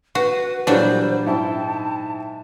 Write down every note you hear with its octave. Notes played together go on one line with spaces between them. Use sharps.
F#4 B4
A#2 E3 F#3 G3 D4 C5
G#2 E4 G5 A5